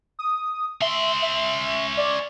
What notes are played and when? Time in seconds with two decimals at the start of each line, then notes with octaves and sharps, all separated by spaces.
0.19 D#6
0.81 C#4 E5 C6
1.22 E5
1.97 D5